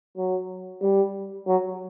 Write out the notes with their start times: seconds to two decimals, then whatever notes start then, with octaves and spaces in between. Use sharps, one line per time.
0.17 F#3
0.82 G3
1.47 F#3